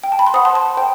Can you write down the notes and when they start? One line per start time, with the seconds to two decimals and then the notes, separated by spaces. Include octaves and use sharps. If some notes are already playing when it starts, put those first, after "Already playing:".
0.03 G5
0.12 A5
0.19 B5
0.27 C6
0.34 C5 F#5 B5 D#6
0.45 A5 C6
0.55 A5
0.77 C5 G5